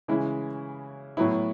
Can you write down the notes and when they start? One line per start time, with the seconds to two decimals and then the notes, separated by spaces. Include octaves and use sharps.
0.08 C#3 E3 G#3 C#4 E4
1.17 A2 F#3 B3 E4